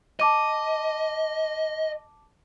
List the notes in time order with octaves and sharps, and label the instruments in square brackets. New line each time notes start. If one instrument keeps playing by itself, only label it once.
[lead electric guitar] D#5 [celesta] A5 D6 D#7